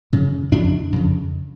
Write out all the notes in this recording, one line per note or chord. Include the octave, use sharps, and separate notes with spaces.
F#2 C#3
F2 C#3 D4
F2 C#3